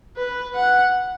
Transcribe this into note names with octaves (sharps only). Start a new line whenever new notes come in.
B4
F#5